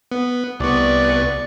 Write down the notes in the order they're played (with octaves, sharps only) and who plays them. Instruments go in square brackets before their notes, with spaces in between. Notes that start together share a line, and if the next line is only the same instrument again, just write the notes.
[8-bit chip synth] B3
[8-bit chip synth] C2 B3 [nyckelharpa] D5 C#6